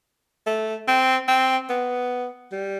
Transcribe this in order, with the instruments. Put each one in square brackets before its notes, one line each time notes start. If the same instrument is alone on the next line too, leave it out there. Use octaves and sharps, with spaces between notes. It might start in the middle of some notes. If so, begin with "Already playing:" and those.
[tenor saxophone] A3
C4
C4
B3
G3